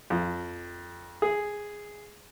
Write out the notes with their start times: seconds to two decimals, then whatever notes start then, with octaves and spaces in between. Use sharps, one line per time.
0.10 F2
1.22 G#4